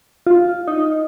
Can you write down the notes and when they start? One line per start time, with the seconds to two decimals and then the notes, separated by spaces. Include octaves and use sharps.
0.27 F4
0.68 D#4